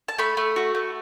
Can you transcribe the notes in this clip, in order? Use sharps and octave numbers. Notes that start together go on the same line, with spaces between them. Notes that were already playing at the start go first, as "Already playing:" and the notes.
A5
A3 B5
A3
F#4
A3